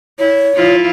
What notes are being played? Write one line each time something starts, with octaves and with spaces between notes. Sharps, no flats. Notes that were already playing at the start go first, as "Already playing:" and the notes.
E4 C#5
F3 E4 F4